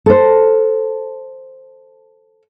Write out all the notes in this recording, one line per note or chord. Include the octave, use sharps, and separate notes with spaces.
A4 C5